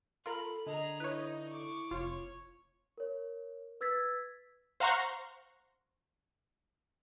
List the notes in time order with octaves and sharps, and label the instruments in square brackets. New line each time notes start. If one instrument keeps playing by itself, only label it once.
[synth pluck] F4 A#4 [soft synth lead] A4 [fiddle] B5
[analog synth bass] D3 [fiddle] G#4 A#5 [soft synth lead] D#5
[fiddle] D#4 D#5 [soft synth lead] E4 [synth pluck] B4 C#5
[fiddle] C#6 D6
[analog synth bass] F1 [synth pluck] F4 [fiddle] C#5
[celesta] A#4 C#5
B4 E6 G#6 A6 B6
[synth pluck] C5 F5 F#5 A#5 C6 C#6